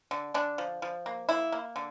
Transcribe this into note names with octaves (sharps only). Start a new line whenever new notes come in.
D3
D3 D4
F3
F3
A#3
A#3 E4
A#3
D3